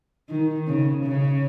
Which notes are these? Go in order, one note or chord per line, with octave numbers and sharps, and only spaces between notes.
D#3
C#3
C#3